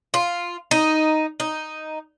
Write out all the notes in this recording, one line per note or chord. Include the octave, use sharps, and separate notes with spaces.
F4
D#4
D#4